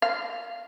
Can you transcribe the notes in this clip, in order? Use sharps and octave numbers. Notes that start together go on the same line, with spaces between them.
F5